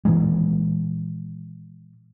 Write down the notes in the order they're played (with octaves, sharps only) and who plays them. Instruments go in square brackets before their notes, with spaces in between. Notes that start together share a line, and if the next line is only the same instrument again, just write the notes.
[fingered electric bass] A#2 D#3 E3 G#3